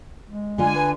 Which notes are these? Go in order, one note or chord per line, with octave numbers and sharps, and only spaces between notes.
G#3
D3 D4 F4 G#5
B4